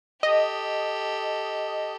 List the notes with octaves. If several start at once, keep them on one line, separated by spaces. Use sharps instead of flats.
G4 A4 D#5